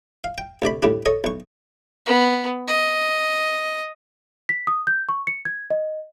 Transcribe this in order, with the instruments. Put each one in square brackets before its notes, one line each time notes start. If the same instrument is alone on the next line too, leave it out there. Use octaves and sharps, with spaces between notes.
[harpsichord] F5
G5
D2 C3 D5 B5
D#2 A2 G3 D4
A4 C#5 D#5
B1 C#6
[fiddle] B3
D#5
[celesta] B6
D#6
G6
C#6
C#7
G#6
D#5